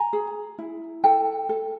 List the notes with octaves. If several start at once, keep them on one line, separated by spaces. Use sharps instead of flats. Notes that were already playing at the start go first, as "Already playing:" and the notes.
Already playing: G#5 A#5
G#4
E4
A4 G5 A5
A4